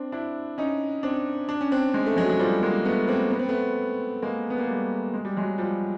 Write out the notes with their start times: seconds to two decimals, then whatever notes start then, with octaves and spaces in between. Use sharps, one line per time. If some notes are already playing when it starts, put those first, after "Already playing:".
Already playing: C4 D4
0.12 D4 E4
0.58 C#4 D#4
1.03 C4 D4
1.49 D4
1.61 C#4
1.72 C4 D4
1.94 G#3
2.06 A3
2.16 F#3 G#3
2.29 F#3
2.39 F3 G3
2.63 G#3 A#3
2.85 A3 B3
3.08 A#3 C4
3.31 B3
3.39 C4
3.49 A3 B3
4.23 G#3 A#3
4.50 B3
4.59 A#3
4.67 G3 A3
5.14 G#3
5.25 G3
5.36 F#3 G#3
5.58 F3 G3